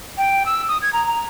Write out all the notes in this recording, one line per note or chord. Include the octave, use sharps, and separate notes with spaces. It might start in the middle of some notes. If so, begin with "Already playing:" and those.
G5
E6
D#6
G#6
A#5
A#5